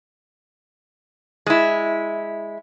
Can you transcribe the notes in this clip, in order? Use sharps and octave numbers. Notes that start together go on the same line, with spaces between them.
G#3 E4